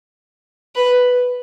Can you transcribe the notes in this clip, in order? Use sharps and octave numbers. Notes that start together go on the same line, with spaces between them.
B4